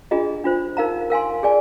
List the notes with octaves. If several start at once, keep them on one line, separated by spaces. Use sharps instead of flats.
D4 F4 G#4 D#5 A#5
D4 F4 C5
D#4 A#4 F5 A#5
A#4 F5 G#5 C6
G#4 D5 G#5